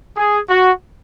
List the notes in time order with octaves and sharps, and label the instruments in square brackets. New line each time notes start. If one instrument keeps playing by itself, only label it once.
[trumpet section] G#4
F#4